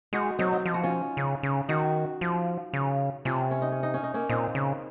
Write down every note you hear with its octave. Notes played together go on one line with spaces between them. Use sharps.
G#3 D#4 F#4
F#3 C4 D#4
C4 D#4
F3 F4
F#4
C#4 F4
C#3
C#3
D#3 D#4 F#4
F3
C#3
C3 C#4 F4
C#4
D#4
C#4
D#4
C#4
D#4
A#3 C#4
A#2 C4 D#4
C#3